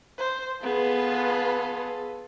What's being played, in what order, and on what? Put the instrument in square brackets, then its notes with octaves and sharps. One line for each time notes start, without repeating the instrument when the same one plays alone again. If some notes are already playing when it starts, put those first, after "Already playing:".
[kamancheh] C5
[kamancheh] B3 [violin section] F4 A4 B4 [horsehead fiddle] G#4